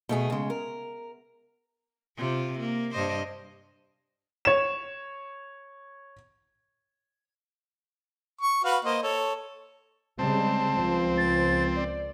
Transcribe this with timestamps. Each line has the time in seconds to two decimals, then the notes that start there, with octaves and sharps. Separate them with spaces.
0.09 B2 A3 G#4
0.30 C#3 G#3
0.50 A#4
2.17 C3 F4
2.59 A#3
2.92 G2 C5 D#5
4.45 C#5 E7
8.41 C#6
8.64 F#4 B4 F5
8.85 A#3 C5 D#5
9.03 A4 C#5
10.19 C#3 G3 G#3 C4 A5
10.77 C#2 F3
11.17 A6
11.76 D5